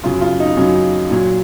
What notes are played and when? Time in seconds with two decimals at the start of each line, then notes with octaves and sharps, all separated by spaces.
0.04 F#2 C#3 F#3 F4
0.21 F4
0.40 D#4
0.57 F#2 C#3 F#3
1.10 A#2 F#3